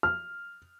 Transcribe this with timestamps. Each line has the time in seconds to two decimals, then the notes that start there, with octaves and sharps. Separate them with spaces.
0.03 F6